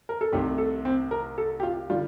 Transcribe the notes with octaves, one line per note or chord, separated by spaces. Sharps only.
A#4
A4
C2 C3 D#3 A3 G4
A4
C4
A#4
A4
G4
F4
D3 G3 F4